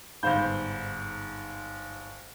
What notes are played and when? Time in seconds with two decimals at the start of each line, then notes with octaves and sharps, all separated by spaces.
0.23 G1 G#2 C5 F5 B5 G6